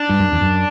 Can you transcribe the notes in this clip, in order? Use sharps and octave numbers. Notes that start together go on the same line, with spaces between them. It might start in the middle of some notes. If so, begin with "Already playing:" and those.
Already playing: D4
G2
F#2
E2
F#2